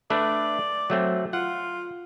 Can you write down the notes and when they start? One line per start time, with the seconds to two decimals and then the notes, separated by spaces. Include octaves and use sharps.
0.10 A3 D4 B4 D5
0.90 F#3 A3 C4
1.33 F4 F#5